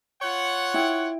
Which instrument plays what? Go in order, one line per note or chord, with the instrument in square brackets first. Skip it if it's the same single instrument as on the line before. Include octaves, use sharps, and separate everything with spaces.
[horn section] F4 C#5 F#5
[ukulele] E4 G5